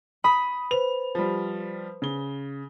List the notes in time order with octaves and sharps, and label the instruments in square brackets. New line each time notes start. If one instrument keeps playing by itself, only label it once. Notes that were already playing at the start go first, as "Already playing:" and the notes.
[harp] B5 [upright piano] D#6
[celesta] B4 C5 [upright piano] F7
[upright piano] F3 G3
C#3 G7